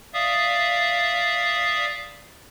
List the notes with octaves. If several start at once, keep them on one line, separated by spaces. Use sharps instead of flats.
D5 E5 F5 D#6